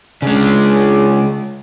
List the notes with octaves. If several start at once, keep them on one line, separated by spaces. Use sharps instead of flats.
C#3 G#3 D4 G#4